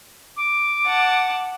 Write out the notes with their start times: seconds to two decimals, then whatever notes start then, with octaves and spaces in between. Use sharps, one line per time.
0.37 D6
0.86 F#5 A5